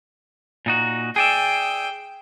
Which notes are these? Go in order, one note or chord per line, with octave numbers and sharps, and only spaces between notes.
A#2 D#4 F#4
G#4 D5 E5 G5